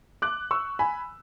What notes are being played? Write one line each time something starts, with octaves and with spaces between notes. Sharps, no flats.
D6 F#6
C#6 E6
G#5 B5